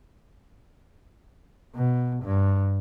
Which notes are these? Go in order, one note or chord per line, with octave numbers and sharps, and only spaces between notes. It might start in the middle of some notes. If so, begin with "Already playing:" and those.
B2
G2